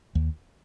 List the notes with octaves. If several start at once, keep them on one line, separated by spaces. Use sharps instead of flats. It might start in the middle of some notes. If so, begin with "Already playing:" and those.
D#2